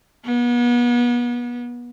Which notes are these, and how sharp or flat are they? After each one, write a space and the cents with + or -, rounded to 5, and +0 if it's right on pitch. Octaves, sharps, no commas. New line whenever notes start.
B3 -35